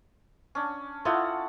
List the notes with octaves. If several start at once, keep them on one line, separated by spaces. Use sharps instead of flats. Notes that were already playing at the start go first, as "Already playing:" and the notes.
C#4 D4
E4 F4 A4 D#5 F#5